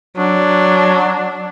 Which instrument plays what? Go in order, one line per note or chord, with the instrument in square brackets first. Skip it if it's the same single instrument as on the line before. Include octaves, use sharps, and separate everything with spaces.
[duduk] F#3 [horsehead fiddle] D4